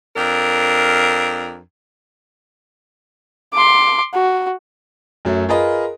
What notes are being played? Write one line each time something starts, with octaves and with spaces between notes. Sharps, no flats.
F2 D4 A#4
C6 D6
F#4
F#2 F#3 A3
F4 G#4 A#4 B4 D#5